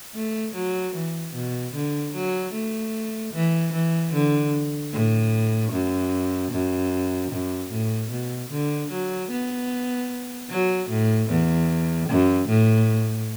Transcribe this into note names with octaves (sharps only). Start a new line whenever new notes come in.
A3
F#3
E3
B2
D3
F#3
A3
E3
E3
D3
A2
F#2
F#2
F#2
A2
B2
D3
F#3
B3
F#3
A2
E2
F#2
A2